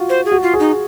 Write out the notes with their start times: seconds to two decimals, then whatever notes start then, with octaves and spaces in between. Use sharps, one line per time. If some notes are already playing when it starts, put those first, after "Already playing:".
Already playing: F4 F#4
0.09 C5
0.25 G#4
0.32 F#4
0.42 F4
0.53 G#4
0.60 D#4